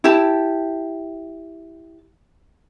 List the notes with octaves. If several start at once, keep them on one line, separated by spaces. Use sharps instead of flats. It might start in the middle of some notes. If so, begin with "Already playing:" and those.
E4 G4 A5